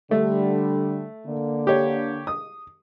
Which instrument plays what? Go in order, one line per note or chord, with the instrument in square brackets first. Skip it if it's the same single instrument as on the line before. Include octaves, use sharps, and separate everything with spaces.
[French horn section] D3 G3 [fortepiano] A3
[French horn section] D3 A#3
[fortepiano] G4 C#5
D#6